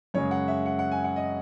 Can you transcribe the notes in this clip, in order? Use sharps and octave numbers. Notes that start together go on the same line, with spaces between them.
F#2 C#3 G#3 C#5
F#5
E5
F#5
F#5
G#5
F#5
D#5